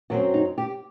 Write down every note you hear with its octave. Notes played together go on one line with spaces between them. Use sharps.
F#2 F#3 C4 F#4
D#4
G4